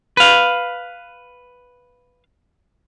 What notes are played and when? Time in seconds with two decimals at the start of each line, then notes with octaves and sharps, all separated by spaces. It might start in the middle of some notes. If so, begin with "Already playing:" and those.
0.17 B4 F5